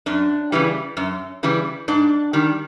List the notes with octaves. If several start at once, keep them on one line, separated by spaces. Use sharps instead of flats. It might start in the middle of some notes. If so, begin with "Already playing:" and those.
F#2 D4
C#3 E3 G3
F#2
C#3 E3 G3
G#2 D4
D#3 G3